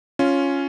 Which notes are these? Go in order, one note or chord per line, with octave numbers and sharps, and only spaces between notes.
C#4 F4